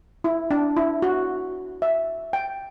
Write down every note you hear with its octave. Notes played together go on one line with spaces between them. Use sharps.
E4
D4
E4
F#4
E5
G5